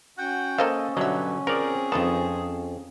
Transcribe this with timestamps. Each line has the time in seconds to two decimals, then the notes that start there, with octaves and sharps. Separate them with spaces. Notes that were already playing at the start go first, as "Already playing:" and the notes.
0.18 C#4 F#4 F#5 G5
0.58 A#3 A4 C5 D#5 F5
0.97 G2 B2 D3 F#3 D#5 E5
1.47 F3 C4 G#4 A#4 D5
1.92 F2 B3 D#4 F4 A5